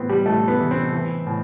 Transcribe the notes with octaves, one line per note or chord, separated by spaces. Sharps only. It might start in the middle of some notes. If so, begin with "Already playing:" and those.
Already playing: A2 E3 B3 C4
G3
A2 A3
B3
E3
C4
E3
A2